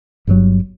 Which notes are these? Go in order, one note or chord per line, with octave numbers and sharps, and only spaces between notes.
G1 G2 D3 F#3